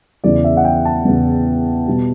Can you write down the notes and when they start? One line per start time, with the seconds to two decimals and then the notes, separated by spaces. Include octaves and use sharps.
0.24 E2 C#3 E3 D5
0.44 E5
0.57 F#5
0.65 G5
0.85 A5
1.05 E2 C#3 E3
1.87 B2 G3